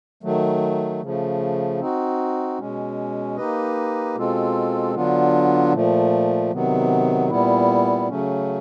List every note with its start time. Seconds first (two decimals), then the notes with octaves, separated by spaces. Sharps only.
0.23 D#3 F#3 A3
1.02 C#3 F3 A3
1.80 C4 D#4 F#4
2.58 B2 G#3 C#4
3.37 A#3 D#4 G4 B4 D#5
4.16 B2 G#3 C4 F4 A4
4.95 D3 F#3 B3 D4 F4
5.72 A#2 F3 A3
6.51 C3 D#3 F#3 B3
7.30 A#2 G3 B3 E4
8.09 C#3 F#3 A3 C#4